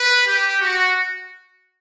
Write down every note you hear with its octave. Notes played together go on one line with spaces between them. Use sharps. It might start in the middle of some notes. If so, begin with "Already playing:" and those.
Already playing: B4
G4
F#4